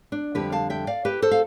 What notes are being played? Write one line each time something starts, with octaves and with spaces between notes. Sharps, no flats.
D4
F2 D3 G3 G4 B4
F5 A5
E5 G5
D5 F5
G4 B4
A4 C5
F5